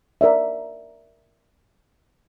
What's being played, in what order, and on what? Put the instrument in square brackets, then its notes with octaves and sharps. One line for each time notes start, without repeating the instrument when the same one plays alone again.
[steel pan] A#4 D5 E5